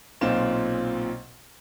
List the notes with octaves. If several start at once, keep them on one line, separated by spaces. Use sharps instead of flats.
B1 A#2 C4 F4 E7